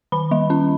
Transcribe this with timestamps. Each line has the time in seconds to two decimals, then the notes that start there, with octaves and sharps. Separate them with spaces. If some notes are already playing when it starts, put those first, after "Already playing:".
0.12 D#3 B5
0.31 G3
0.50 C#4